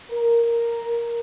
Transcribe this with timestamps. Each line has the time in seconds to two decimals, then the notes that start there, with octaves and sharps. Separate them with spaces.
0.11 A#4